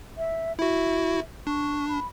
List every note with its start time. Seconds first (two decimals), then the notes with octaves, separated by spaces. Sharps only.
0.17 E5
0.59 E4 F#4 E5
1.47 D4 C#6
1.88 B5